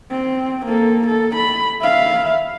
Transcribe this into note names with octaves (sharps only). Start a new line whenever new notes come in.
C4
A#3 A4
A4
B5
E5 F5